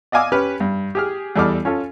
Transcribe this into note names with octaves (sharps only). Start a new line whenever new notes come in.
D5 D#5 F5 G#5 D6 E6
C#4 G4 B4 F6
G2
G4 G#4 F6
E2 G3 A4 D#5 D6 F6
C#4 F4 A4